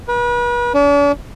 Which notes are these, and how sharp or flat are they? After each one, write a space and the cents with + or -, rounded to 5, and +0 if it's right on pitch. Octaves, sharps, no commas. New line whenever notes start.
B4 -40
D4 -45